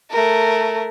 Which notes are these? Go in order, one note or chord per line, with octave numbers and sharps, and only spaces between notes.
A3 A#4